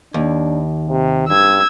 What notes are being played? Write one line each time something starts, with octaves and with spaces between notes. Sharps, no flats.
D#2 D4
C3
G2 E6 G#6